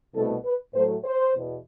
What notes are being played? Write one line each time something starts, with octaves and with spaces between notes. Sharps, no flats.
C2 B2 A3 A4
B4
A2 F#3 A3 C5
C5
E2 B2